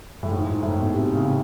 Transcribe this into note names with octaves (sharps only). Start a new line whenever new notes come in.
A2
G#2
G#2
A2
B2
C3
C#3